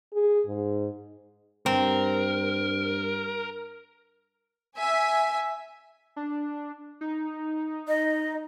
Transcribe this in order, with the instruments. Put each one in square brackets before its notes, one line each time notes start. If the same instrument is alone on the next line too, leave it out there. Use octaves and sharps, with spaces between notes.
[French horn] G#4
G#2
[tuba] G2 [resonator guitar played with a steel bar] C4 [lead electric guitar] A#4
[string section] E5 G#5
[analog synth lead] D4
D#4
[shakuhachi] D#5